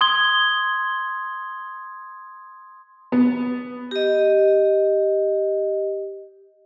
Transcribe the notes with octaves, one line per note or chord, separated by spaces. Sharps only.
C6 D#6 G#6 G7
B3
G4 D#5